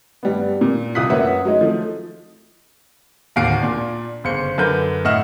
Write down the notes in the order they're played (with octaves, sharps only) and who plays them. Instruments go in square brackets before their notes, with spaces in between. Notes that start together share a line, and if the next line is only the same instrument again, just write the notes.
[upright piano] G2 G3 B3
A#2
C2 C3 F4 D#6 F#6 B6
F#2 A#3 C#4 B4 E5 F#5
F#3 G#3 D#4
F3 A3
[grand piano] D1 D#2 F5 F#5 C7 D7
A#2 D4
G1 C#3 C5 C#7
F#2 D3 A#4 B4 G6
A2 D#5 E5 F#5 F6 E7